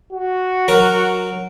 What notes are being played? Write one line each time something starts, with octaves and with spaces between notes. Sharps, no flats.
F#4
F#3 A#4